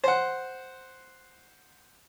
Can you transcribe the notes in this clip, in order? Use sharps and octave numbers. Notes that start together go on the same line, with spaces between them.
C5 F#5